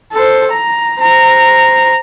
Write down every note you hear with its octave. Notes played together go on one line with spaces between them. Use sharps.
A4 C5
A#5
C5 A#5